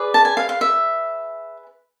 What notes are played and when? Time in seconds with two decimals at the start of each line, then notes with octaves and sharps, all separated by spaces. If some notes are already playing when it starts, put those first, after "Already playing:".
Already playing: G#4 B4 D5
0.14 A5
0.25 G#5
0.37 F5
0.49 F5
0.61 E5